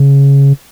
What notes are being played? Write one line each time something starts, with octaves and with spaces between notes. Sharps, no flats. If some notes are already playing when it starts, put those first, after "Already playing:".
Already playing: C#3